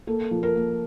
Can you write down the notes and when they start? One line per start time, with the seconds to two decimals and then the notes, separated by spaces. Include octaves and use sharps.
0.07 A#3 A4
0.31 F3
0.43 A#4
0.56 A#3